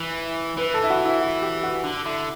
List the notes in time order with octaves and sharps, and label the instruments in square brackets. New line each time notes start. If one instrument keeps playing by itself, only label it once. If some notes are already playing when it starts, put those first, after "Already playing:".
Already playing: [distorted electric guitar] E3
[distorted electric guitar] E3 [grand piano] B4
[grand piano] A4
E4
F#4
E4
F#4
G4
F#4
[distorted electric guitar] D3
[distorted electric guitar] D3 [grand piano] E4